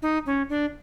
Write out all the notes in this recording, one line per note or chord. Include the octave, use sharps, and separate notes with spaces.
D#4
C#4
D4